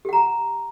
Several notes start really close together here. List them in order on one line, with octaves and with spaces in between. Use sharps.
G4 F#5 A#5